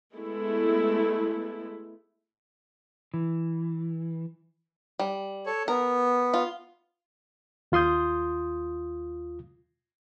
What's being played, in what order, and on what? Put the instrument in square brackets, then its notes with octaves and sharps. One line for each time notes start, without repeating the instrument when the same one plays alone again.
[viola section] G#3 A3 B3 E4
[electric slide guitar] E3
[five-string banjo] G3
[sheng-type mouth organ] A4 C#5
[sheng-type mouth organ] B3 [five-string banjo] A#4
[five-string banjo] F4
[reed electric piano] D#2 F4 C6 D#6 G6